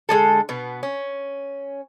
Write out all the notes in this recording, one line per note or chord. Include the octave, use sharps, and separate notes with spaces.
D3 G#3 G#4 A4
B2 B3
C#4